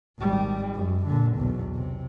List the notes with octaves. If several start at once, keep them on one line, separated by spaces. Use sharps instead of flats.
G#1 G3
F#2
A#2 D3
B1 E2
C3